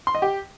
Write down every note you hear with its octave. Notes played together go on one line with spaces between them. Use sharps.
C6
D#5
G4